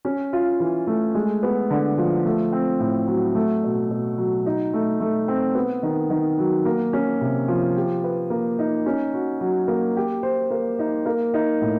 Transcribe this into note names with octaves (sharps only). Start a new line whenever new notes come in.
C#4
F4
E3
A3
G#3
B3
D3
F3
A3
C4
A2
F#3
A3
B2
B2
F#3
D#4
A3
A3
C4
B3
D#3
D#3
F#3
A#3
C#4
C3
F3
G4
B4
A#3
D#4
C#4
F#4
F#3
A#3
G4
C5
A#3
D#4
A#3
D#4
A2